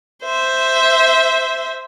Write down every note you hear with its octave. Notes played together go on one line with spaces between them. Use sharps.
C5 E5